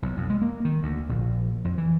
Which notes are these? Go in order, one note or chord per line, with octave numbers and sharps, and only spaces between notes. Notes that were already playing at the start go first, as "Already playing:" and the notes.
B1
F2
G#3
A#3
D#3
D2
A#1
F2
E3